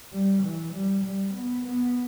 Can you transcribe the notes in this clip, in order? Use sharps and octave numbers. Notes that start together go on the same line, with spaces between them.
G3
E3
G3
G3
B3
B3